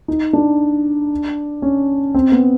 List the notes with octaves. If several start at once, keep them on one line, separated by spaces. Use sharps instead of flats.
D#4
D4
C#4
C4
B3